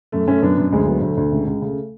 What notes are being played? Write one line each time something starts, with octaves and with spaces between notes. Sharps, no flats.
F#2 A3
F#2 A3 C#4
F#2 B3 D4
F#2
D2 G#3
F#3 G#3 B3
D2 A3
D2
C#2
C#2
C#3 A3